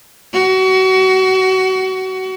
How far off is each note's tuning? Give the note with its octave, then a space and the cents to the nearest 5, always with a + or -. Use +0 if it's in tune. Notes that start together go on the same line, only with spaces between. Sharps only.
F#4 +30